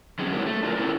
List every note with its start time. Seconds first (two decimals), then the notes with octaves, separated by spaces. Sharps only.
0.19 F#3 C4 C#4 D#4 G#4
0.33 F#3 G#3 A#3 E4 G4 A#4
0.46 A3
0.63 D4 F4 F#4 A#4
0.75 C4 C#4 E4 A4 A#4